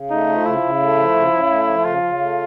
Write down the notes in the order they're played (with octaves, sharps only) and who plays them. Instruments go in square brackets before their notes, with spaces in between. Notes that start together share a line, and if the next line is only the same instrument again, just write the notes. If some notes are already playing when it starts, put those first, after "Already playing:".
Already playing: [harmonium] C#3
[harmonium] A3 [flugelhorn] D#4
[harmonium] F3
[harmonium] C#3 [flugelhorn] E4
[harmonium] C#3
A3
F3
C#3
C#3
A3
F3
[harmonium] C#3 [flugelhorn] F4
[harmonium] C#3
A3